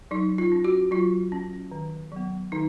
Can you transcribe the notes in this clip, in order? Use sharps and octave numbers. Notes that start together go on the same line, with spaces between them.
F#3 D#4
F4
C#4
F#4
F#3 F4
C#4
D#3
F#3 B3
D#3 D#4